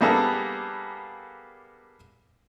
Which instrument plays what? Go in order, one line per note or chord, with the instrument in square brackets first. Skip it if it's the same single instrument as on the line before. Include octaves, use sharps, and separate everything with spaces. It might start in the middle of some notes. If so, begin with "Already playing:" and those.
[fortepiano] G3 A#3 B3 D4 G#4 A4